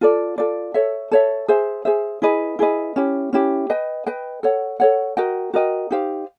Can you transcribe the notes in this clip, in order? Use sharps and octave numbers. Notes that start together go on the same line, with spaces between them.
F4 A4 D5
F4 A4 D5
A4 C#5 E5
A4 C#5 E5
G#4 C5 E5
G#4 C5 E5
E4 G#4 B4 D#5
E4 G#4 B4 D#5
C#4 E4 G4
C#4 E4 G4
B4 D#5 G5
B4 D#5 G5
A4 C#5 F#5
A4 C#5 F#5
F#4 A#4 D#5 G5
F#4 A#4 D#5 G5
D#4 G4 C5 F5